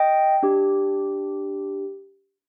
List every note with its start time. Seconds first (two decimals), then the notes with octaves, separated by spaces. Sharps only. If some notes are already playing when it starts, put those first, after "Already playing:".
Already playing: D#5 G5
0.43 D4 G4